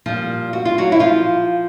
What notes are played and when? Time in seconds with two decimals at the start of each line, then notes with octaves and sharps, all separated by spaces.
0.06 A#2 F3 G3 F4
0.53 F#4
0.65 F4
0.78 F#3 F#4
0.92 E4
0.99 F3 F4